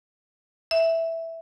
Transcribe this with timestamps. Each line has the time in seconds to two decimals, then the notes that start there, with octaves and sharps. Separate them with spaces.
0.71 E5